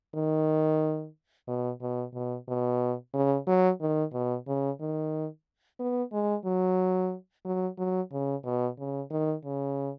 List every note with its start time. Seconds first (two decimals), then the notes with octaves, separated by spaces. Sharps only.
0.15 D#3
1.48 B2
1.82 B2
2.14 B2
2.48 B2
3.14 C#3
3.47 F#3
3.81 D#3
4.13 B2
4.47 C#3
4.80 D#3
5.79 B3
6.13 G#3
6.45 F#3
7.45 F#3
7.78 F#3
8.12 C#3
8.45 B2
8.79 C#3
9.11 D#3
9.45 C#3